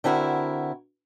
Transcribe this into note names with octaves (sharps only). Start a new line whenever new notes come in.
D3 C4 E4 F#4 A#4